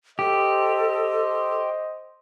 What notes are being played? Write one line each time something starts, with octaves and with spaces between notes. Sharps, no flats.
G4 A4 C5 D#5